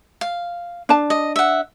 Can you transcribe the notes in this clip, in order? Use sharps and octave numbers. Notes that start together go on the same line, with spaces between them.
F5
D4 A5
D#5
E5 F#5